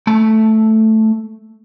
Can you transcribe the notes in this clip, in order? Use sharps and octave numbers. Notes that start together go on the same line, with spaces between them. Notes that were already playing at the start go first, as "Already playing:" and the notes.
A3 A5